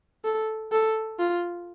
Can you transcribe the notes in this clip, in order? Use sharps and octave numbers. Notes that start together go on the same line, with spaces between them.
A4
A4
F4